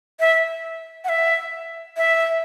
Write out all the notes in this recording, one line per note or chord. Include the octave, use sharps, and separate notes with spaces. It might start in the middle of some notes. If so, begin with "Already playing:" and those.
E5
F#5
E5
E5